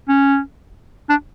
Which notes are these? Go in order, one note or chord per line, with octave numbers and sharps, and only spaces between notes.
C#4
D4